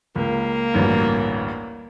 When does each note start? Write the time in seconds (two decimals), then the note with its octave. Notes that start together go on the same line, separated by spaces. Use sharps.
0.16 C#2 A#3
0.74 A1 D2 G2